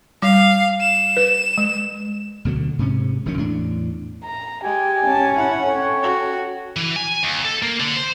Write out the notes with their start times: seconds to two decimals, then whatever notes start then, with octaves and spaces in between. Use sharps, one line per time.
0.22 G3 F5
0.81 E7
1.17 B4
1.58 G#3
2.45 D2 B2 D3 F#3
2.79 G#2 C3 C#4
3.26 F#1 D#3 F#3 C#4
3.37 E2 A2 D4
4.24 A#5
4.64 G#3 G4 G#5
5.05 C#4 A5
5.37 E4 F#5
5.67 A4 C#5 G5
6.02 F#4
6.76 E3
6.96 G#5
7.23 D#2
7.45 A4
7.63 A#3
7.80 D3
7.96 C5